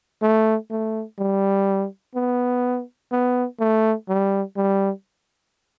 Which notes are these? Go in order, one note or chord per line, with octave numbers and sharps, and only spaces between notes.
A3
A3
G3
B3
B3
A3
G3
G3